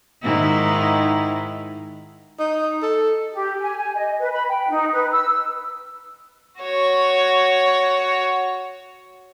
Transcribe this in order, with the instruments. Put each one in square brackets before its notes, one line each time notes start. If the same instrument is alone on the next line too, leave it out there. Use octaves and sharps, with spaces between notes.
[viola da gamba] G#2 D#3 E4
[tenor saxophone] D#4
A4
[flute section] G4
G#5
G#5
D#5
B4
B5
G5
D#4
B4
E6
[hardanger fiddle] F#4 C#5